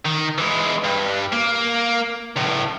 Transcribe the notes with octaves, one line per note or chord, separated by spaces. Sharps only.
D#3
E3 G#3
G2
A#3
C#2 A2